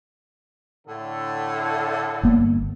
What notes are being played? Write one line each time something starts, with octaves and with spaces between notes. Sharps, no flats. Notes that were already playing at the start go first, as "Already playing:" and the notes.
A2 D3 A4
G1 A#3 B3